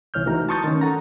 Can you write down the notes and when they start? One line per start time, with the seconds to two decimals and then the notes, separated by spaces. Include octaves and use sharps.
0.14 C2 E3 C#5 F6 G6
0.26 E3 A3 D#4 F#4 A#5
0.49 A5 C6 C#6 D#6 G6 A6
0.64 D#3 C#4
0.81 A4 F#5 A#5